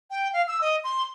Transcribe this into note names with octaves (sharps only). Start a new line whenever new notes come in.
G5
F5
E6
D#5
C6